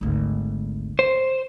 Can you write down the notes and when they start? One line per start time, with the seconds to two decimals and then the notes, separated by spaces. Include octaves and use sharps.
0.01 G#1 D2
0.99 C5